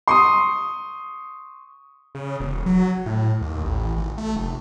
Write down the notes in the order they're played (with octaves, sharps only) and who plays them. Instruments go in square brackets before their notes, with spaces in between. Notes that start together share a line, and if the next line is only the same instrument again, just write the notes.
[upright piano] C6 C#6 D#6
[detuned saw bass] C#3
E1
F#3
A2
D#2
A1
G#1
A3
F1